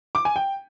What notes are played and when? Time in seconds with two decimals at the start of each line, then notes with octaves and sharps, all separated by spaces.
0.15 D6
0.25 G#5
0.36 G5